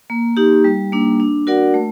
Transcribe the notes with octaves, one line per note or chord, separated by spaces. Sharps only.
A#3
D#4 G4
G3
A#3 D4
D4
F#4 A#4 D5 F#5
A3